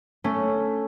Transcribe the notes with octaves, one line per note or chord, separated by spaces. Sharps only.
A3 C#4